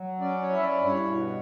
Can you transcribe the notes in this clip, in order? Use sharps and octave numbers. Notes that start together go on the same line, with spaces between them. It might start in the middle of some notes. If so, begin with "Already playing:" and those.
Already playing: F#3
C#4 D5
C#5
E4
E5
D5
G2
C#5
B2